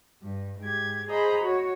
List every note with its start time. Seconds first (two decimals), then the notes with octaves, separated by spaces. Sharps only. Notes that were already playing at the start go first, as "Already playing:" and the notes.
0.21 G2
0.59 G#2 G4 G#6
1.07 G#4 C5 D#5 A#5 B5
1.43 F#4 C#5